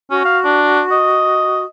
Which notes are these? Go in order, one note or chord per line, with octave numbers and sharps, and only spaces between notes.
C#4 F#4
F5
D4
D#5